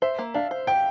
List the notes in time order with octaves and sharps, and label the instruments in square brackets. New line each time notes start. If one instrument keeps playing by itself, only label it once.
[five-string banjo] C5 [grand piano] E5
[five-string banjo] A#3
[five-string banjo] D4 [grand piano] F5
[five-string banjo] C5
[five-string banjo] G4 [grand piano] G5